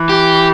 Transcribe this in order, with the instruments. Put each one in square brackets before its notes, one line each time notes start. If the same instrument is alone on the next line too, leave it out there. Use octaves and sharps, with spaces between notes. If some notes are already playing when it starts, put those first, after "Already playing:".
Already playing: [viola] E3
[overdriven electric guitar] G4